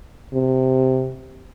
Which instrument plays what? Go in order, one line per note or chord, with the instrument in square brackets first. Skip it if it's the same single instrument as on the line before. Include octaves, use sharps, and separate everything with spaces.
[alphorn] C3